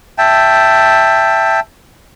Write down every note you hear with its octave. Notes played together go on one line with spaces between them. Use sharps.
E5 G5 A5